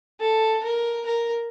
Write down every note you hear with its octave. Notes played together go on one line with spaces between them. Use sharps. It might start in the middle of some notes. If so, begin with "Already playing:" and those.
A4
A#4
A#4